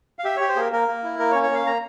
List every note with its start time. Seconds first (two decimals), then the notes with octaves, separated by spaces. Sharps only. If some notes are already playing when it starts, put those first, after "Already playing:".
0.19 F5
0.24 G4 E5
0.37 G4 C#5
0.49 C5
0.56 A#3 G#4 A#4
0.72 A#3 A#4
0.88 A#3
1.04 E4
1.19 A#3 A#4
1.31 C#5
1.35 C#4
1.43 C#5
1.50 A#3 F5
1.66 A#3 A#5